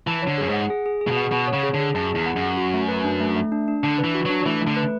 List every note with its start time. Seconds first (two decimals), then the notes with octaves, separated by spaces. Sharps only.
0.07 E3 A5
0.22 D3 C#5
0.38 F#2 G#4
0.49 G#2 F#5
0.70 G#4
0.86 G#4
1.01 G#4
1.07 C#3
1.11 B2
1.17 F#5
1.32 B2 F#5
1.47 C#5
1.53 C#3
1.63 G#4
1.74 D3
1.80 G#4
1.95 F#2 A5
2.10 G#4
2.15 E2
2.26 F#5
2.36 F#2
2.42 F#5
2.57 F#4
2.74 A3
2.89 B4
3.04 D4
3.20 A3
3.36 A3
3.52 D4
3.68 D4
3.83 D3 D4
3.98 B4
4.04 E3
4.15 F#4
4.25 F#3 D4
4.46 E3 A3
4.61 A3
4.67 D3
4.76 B4